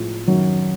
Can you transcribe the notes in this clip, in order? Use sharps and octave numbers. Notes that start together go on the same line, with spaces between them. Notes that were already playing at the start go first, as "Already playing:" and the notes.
Already playing: A2 F3 G#3
F#2 D#3 F#3